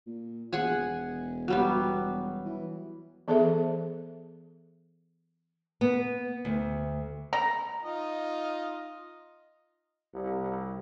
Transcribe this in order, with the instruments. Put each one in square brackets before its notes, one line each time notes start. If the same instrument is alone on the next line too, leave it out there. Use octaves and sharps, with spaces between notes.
[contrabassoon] A#2
[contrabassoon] E1 [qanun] G#4 F#5 G#5
[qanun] F#3 G3 B3
[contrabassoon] E3
[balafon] E3 B3 G#4 A4 C5 E5
[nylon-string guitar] B3
D2
[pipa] A#5
[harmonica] D#4 F4 D#5
[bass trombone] C2